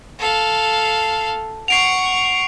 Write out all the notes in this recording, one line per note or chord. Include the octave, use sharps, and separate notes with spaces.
A4 F5
F#5 C#6 C7 D7 F7